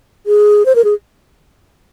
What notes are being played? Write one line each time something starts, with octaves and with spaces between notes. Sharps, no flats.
G#4
C5
A#4
G#4